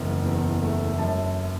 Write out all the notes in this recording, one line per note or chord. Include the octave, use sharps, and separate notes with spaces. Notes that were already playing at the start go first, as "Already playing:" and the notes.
Already playing: F#1 E2
E2
A3
F#2 A5